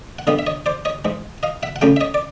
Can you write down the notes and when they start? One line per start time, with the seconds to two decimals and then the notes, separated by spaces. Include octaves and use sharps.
0.19 F#5
0.27 D3 G3 B3 D#5 F5
0.39 E5
0.47 C#5 D#5
0.66 C5 D5
0.85 C#5 D#5
1.05 G#2 E3 G#3
1.43 D#5 F5
1.63 E5 F#5
1.76 F#5
1.81 C#3 F#3 A3 C#4 F5 G5
1.96 E5
2.01 C#5 D#5
2.14 D5